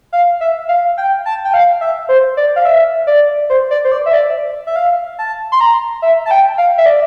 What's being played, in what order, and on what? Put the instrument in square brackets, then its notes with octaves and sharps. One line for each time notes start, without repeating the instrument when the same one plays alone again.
[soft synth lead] F5
E5
F5
G5
A5
G5
F5
E5
C5
D5
F5
E5
D5
C5
D5
C5
D5
E5
D5
E5
F5
A5
C6
A#5
E5
A5
G5
F5
E5
D5